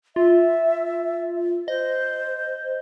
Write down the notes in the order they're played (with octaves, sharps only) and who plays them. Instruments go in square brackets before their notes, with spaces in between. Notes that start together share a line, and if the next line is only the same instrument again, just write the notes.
[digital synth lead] F4 [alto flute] E5
[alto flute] C5 [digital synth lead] D#5